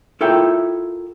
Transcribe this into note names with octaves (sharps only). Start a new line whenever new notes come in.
E4 F4 A4 A#4 E5 G5